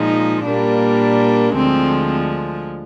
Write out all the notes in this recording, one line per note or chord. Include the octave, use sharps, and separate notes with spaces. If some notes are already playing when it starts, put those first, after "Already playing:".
Already playing: A#2 F3 G#3 D#4
A#2 G3 A#3 D4
D2 D3 F3 G#3 C4